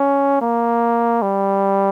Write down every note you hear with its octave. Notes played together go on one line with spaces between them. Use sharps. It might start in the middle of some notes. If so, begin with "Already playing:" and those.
Already playing: C#4
A#3
G3